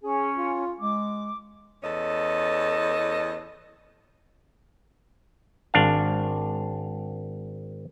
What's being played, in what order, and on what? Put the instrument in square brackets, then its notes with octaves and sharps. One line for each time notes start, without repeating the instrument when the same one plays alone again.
[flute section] C#4 [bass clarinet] G#4
[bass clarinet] F4
[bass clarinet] G#3 [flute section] D6
[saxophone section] E2 C#4 A4 D#5
[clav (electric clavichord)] G#1 D4 F5